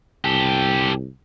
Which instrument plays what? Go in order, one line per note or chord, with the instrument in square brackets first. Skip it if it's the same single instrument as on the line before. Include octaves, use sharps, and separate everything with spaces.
[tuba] C2 [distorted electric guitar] G4 A4